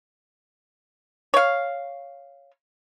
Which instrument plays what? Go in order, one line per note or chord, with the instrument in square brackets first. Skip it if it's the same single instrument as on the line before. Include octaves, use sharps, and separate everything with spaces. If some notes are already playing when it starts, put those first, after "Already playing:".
[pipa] C#5 F5